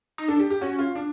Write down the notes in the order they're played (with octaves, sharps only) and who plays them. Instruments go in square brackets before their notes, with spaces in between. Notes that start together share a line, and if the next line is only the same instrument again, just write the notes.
[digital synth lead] D#4
[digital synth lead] D4 [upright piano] A4
[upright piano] G4
G4
[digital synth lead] C#4 [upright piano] F#4
[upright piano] F4
D4